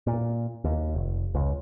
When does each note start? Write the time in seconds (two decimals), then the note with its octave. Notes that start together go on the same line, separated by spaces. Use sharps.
0.07 A#2
0.64 D#2
0.94 F1
1.34 C#2